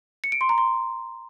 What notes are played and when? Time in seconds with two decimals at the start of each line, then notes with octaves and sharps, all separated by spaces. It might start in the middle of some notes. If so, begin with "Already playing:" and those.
0.24 C#7
0.32 D7
0.41 C6
0.49 A#5
0.58 C6